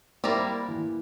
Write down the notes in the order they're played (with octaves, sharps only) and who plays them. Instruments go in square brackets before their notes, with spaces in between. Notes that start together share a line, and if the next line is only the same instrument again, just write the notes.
[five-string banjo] G3 C4 E4 A#4 D5 [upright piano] A#3
[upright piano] E3